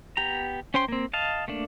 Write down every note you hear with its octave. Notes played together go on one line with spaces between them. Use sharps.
B3 G4 A#5
C#4 C5 G5 C6
A#3 C4
D#5 F5 A5
A3 A#3 D4